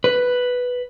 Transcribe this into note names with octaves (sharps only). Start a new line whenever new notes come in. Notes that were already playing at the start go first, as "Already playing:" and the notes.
B4